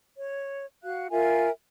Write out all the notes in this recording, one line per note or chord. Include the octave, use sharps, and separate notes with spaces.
C#5
F#4 F5 F#6
F4 A#4 E5 G#5